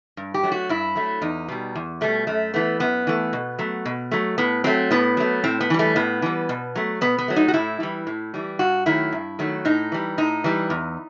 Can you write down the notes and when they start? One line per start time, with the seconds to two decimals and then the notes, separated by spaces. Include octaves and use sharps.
0.17 G2
0.34 G4
0.43 F#3 A3
0.52 F#4
0.69 G2 E4
0.95 F#3 A3
1.22 E2 D#4
1.49 B2 G3
1.75 E2
2.01 B2 G3 A3
2.27 F#2 A3
2.54 E3 A3 B3
2.80 F#2 B3
3.07 E3 A3
3.33 B2
3.59 F#3 A3
3.85 B2
4.11 F#3 A3
4.38 A2 B3
4.64 F#3 A3 C4
4.91 A2 B3
5.17 F#3 A3
5.44 A2 C4
5.60 B3
5.70 E3 G3
5.79 A3
5.96 A2 B3
6.22 E3 G3
6.49 B2
6.75 F#3 A3
7.01 B2 B3
7.18 B3
7.28 F#3 A3
7.36 D#4
7.48 F#4
7.54 A2 E4
7.80 E3 G3
8.07 A2
8.34 E3 G3
8.59 G2 F#4
8.86 D#3 F#3 A3 E4
9.12 G2
9.39 D#3 F#3 A3
9.65 A2 D#4
9.92 E3 G3
10.18 A2 D#4
10.44 E3 G3
10.70 E2